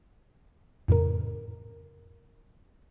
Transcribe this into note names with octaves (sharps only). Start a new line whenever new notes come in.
F2 A2 C#3 A#4